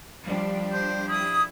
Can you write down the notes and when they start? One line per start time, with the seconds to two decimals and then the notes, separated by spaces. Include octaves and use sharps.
0.25 F3 G3 D4 G4
0.73 C5
1.08 E4 D#6